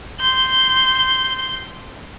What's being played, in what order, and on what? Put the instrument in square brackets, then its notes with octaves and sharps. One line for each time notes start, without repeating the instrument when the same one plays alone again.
[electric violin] C6 G6